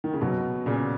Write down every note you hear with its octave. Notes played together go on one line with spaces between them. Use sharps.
D#3
C#3
B2 F#3
A#2 C#3